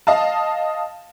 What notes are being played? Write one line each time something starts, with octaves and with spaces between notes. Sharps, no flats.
D#5 F5 A5